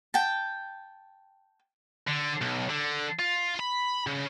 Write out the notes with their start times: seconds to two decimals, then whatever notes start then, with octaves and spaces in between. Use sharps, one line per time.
0.14 G5 A5
2.07 D3
2.41 B1
2.70 D3
3.19 F4
3.60 B5
4.07 C#3